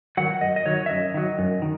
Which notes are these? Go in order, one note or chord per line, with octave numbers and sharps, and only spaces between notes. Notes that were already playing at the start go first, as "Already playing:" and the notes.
D#3 F#3 F#5
F#2 D#5
D#5
D#3 F#3 C#5
E5
F#2 D#5
D#3 F#3
F#2
D#3